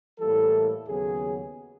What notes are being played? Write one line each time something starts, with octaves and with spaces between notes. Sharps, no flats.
A2 E3 G3 A#3 A4
D#2 C#3 F#3 B3 G#4